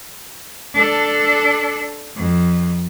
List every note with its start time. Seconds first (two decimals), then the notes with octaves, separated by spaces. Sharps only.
0.75 D4 A4
2.16 F2